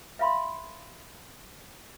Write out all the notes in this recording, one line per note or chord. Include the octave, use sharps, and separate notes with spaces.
E5 F5 B5 C6